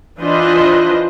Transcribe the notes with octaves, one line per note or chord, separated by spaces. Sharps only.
E3 D4 F4 B4 C5 D#5